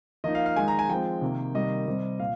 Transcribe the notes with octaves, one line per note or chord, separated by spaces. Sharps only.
F3 A#3 D#4 D#5
F5
F5
D#3 G#3 D#4 G#5
A#5
G#5
F3 G#3 C4 G5
C3 D#3 A#3
C3 D#3 G3 A#3 D#5
C3 G3 C4
A#2 F5